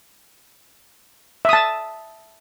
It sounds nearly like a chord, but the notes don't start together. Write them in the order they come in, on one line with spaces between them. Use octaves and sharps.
E5 D#6 A5